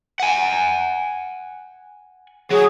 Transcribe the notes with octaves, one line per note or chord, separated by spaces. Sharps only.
F#5 G#5
F#3 G#4